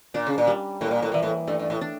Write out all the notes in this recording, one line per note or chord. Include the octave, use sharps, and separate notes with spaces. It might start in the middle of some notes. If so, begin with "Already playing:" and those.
A#2 D4
C#3
A#2
G3
A2 A#3
A#2
A2
A#2 E3
A2
G2 A3
G2
A2
D4